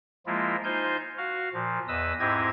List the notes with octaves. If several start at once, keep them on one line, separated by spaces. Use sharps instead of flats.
F3 G#3 A#3 E4 F4
D#4 F4 C5 G#5 G6
F#4 F5
A#2 F3
E2 B4 D#5 D#6 E6
G#2 C4 E4 G4 D#5 G#6